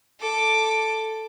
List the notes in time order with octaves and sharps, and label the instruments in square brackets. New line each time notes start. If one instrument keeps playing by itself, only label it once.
[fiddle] A4 D6